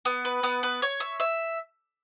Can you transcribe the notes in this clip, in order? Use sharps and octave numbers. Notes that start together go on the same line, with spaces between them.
B3
B4
B3
B4
C#5
E5
E5